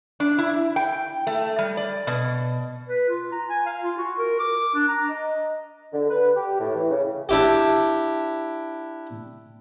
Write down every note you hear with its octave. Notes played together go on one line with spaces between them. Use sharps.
D4
E4
G5
A3
G3
D5
B2
B4
F4
A#5
G#5
F5
F4
F#4
A#4
D6
D4
A#5
D#5
D3
B4
G4
A2
E3
C#3
D4 E4 G4